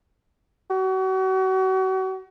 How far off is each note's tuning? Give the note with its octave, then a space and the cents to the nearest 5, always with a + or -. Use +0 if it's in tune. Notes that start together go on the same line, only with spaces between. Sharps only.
F#4 +35